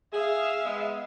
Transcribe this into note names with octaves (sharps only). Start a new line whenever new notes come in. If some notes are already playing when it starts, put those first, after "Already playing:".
G#4 E5 F5
G#3 B3